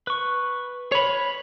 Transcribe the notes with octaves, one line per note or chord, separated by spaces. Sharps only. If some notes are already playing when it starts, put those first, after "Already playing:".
B4 C#6
C#5 B5